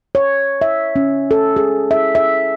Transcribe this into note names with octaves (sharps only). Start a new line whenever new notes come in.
C#5
E5
C#4
A4
G#4
E5
E5